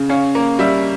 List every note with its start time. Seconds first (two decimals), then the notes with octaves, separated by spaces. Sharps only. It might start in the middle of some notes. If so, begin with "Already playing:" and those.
Already playing: C#3
0.09 C#4 F5
0.35 A#3
0.59 G3 E5